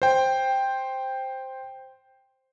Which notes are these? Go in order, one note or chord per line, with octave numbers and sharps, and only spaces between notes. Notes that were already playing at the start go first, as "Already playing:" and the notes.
C5 G5